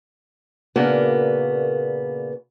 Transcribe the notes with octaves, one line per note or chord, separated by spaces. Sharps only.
A#2 C#3 A#3 B3 D4 F#4